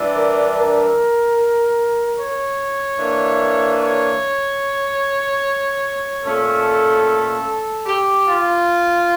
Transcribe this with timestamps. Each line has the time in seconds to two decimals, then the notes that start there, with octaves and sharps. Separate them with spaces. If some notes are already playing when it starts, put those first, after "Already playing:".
Already playing: E3 G3 D4
0.14 A#4
0.54 A#4
2.17 C#5
2.98 E3 A#3 D4
3.79 C#5
6.23 A#2 A3 C#4 A4
7.86 G4
8.27 F4